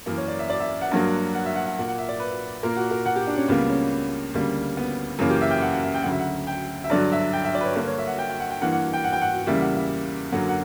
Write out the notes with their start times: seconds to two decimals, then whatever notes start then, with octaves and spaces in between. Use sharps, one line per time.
0.06 F#2 E3 A#3 A#4
0.17 C#5
0.28 D5
0.39 E5
0.50 D5
0.60 E5
0.82 F#5
0.91 G2 F#3 A#3
1.35 F#5
1.45 E5
1.56 F#5
1.66 F#5
1.77 A#2 A#3 F#5
1.88 F#5
1.98 E5
2.09 D5
2.20 B4
2.63 A#2 A#3 A#4
2.77 F#4
2.91 A#4
3.06 F#5
3.16 G4
3.27 D4
3.37 C#4
3.48 C#2 C#3 G3 A#3 B3
3.70 C#4
4.34 D2 C#3 G3 A#3
4.77 B3
5.19 F#2 C#3 E3 A#3 C#4
5.30 G4
5.41 E5
5.51 G5
5.62 F#5
5.73 F#5
5.84 E5
5.94 G5
6.02 D2 C#3 F#3 F#5
6.12 E5
6.20 F#5
6.47 G5
6.84 E5
6.90 G2 D3 F#3 D5
7.12 E5
7.33 G5
7.44 E5
7.55 D5
7.61 B4
7.65 C#5
7.75 G2 D3 A#3 B4
7.87 C#5
7.98 E5
8.07 F#5
8.19 G5
8.29 G5
8.40 F#5
8.50 G5
8.61 G2 E3 A#3 F#5
8.72 F#5
8.93 G5
9.04 F#5
9.13 G5
9.22 F#5
9.47 E2 C#3 G3 A#3 E5
9.61 F#5
9.75 E5
10.32 F#2 D3 F#3 A#3 F#5
10.49 F#5